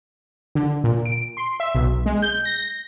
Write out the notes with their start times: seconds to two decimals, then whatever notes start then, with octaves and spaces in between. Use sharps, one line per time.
0.55 D3
0.84 A#2
1.06 D7
1.37 C6
1.60 E5
1.75 B1
2.06 G#3
2.22 G6
2.45 A#6